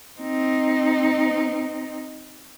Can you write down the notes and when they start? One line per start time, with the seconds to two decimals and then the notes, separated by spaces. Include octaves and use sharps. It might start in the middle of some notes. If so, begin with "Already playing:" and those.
0.19 C4 D#4